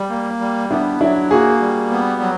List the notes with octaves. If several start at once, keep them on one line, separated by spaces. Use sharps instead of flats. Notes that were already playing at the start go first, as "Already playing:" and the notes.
Already playing: G3
A#3
G3
B3 D4 E4
F#3 D4 E4
A#3 F#4 G#4
G3
B3
F#3